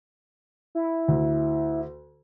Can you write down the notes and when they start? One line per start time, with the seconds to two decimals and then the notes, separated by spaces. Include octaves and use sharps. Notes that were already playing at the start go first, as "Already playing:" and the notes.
0.75 E4
1.08 D2